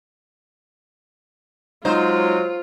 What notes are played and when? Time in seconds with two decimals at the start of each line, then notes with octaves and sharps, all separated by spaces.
1.85 F#3 G#3 D#4 F4 C5